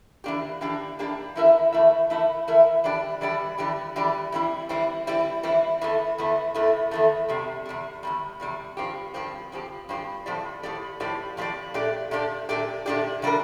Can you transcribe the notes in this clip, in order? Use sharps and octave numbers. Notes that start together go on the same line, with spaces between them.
E3 A#3 D4 G4
E3 A#3 D4 G4
E3 A#3 D4 G4
E3 A3 E4 A#4 E5
E3 A3 E4 A#4 E5
E3 A3 E4 A#4 E5
E3 A3 E4 A#4 E5
E3 G3 D4 G4 D5
E3 G3 D4 G4 D5
E3 G3 D4 G4 D5
E3 G3 D4 G4 D5
E3 G3 C4 E4
E3 G3 C4 E4
E3 G3 C4 E4
E3 G3 C4 E4
E2 E3 A3
E2 E3 A3
E2 E3 A3
E2 E3 A3
E2 C3 G3
E2 C3 G3
E2 C3 G3
E2 C3 G3
G2 F3 C4 G4
G2 F3 C4 G4
G2 F3 C4 G4
G2 F3 C4 G4
A2 F3 C4 G4 D5
A2 F3 C4 G4 D5
A2 F3 C4 G4 D5
A2 F3 C4 G4 D5
A#2 A3 D4 G4 D5
A#2 A3 D4 G4 D5
A#2 A3 D4 G4 D5
A#2 A3 D4 G4 D5
C3 G3 D4 F4 A#4